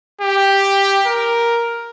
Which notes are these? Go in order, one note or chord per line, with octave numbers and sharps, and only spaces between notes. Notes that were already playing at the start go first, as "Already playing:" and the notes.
G4
A#4